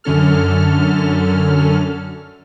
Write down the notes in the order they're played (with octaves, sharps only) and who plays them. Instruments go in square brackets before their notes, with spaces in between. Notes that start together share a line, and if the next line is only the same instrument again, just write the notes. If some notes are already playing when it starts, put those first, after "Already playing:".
[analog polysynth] F#2 D3 C#4 A4 F6